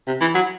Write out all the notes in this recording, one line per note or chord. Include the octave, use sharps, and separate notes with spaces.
C3
E3
F#3